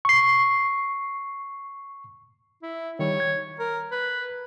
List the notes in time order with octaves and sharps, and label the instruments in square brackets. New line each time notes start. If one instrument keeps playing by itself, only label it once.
[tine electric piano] C#6 C7
[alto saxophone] E4
[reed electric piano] D#3 G3 [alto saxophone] C#5
[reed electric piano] G#6
[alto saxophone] A#4
B4